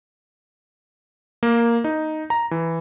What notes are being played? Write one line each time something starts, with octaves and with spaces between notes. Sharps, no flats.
A#3
D#4
A#5
E3